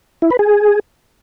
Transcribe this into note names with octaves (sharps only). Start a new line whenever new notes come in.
E4
B4
G#4